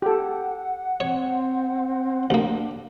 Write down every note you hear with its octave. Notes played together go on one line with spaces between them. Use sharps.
G4 A4 F#5
C4 C#5
D2 A#3 D4